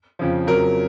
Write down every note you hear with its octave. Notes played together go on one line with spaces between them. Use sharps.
F2 C#3 F3
F2 C#3 F#3 A#4